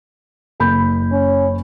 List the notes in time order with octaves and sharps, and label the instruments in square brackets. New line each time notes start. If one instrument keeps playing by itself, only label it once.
[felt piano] F#1 B5 G6
[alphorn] C#4